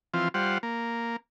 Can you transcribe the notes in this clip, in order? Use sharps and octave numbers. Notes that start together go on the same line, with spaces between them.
E3 F3 C4 F4
G3 F4 C5 F#5
A#3